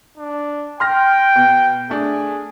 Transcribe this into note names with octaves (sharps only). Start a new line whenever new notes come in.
D4
G5 C6 F6 A#6
B2
A3 D4 G#4